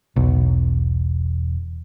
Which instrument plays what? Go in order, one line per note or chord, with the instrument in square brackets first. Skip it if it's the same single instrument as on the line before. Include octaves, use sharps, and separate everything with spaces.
[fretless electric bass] E1 [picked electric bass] B1